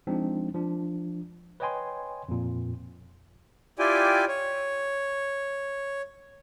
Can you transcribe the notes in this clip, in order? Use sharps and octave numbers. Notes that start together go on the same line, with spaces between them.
F3 G#3 C4 D4 D#4
F3 D4
B4 C#5 D#5 G5 G#5 C6
F2 A#2
E4 F4 G4 D5 G5 G#5
C#5